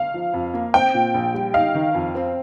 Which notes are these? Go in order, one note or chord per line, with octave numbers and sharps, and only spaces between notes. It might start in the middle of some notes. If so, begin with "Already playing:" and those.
Already playing: F5
F3
F2
A#3
C4 G5
A#2
A#1
G3
D#4 F5
D#3
F2
C4